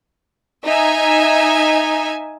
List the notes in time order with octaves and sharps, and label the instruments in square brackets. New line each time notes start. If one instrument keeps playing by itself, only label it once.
[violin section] D#4 E5 G#5